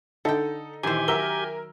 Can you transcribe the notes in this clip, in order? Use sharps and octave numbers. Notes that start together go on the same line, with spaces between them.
D3 D#4 A4 G5
A#1 D#3 E3 G4 C5 G#5
F#3 A#4 E5 E6 G7